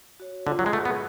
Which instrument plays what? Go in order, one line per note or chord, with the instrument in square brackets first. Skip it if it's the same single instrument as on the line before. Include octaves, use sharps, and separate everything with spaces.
[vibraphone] F#4 C#5
[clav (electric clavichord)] D3 [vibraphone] F4
[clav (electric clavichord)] F#3
G#3
[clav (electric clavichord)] A3 [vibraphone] G#4 B4 F#5
[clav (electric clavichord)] B3